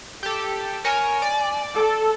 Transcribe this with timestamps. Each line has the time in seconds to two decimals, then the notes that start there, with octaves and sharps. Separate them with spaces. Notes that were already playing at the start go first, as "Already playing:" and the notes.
0.23 G4 A4
0.85 A#4 C#5 G#5
1.22 D5
1.75 A4